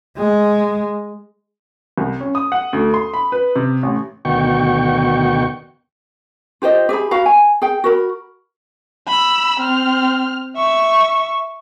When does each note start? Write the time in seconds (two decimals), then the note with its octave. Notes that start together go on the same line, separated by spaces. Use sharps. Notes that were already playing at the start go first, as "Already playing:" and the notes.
0.17 G#3
1.98 C2
2.20 C#4
2.35 D#6
2.52 F#5
2.73 D2
2.94 C6
3.14 B5
3.32 B4
3.56 C3
3.83 A1
4.25 D2 B2 D#3 F#4 G5 C#6
6.62 F4 G4 C5 D#5
6.89 G4 G#4 E5 B5
7.11 F#4 F5 B5
7.26 G#5
7.62 G#4 G5
7.84 F#4 A#4 B5
9.08 B5 E6
9.60 C4 F6
10.56 E5 C#6